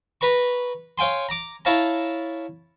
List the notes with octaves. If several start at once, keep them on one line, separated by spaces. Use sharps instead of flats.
B4 A#5 C#6
C#5 F5 G5 G#5 C6
A#5 D6
E4 C#5 F5 A5 A#5